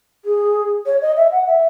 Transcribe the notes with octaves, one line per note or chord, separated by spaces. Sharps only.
G#4
C#5
D#5
E5
F#5
E5